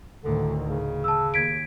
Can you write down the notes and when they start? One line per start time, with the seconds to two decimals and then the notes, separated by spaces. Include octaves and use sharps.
0.24 D2 A2 D3 D#3
0.68 C#3
1.04 A5 E6
1.34 D#2 G#6 B6 D7